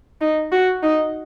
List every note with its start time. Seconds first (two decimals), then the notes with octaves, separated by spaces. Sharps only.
0.21 D#4
0.52 F#4
0.83 D#4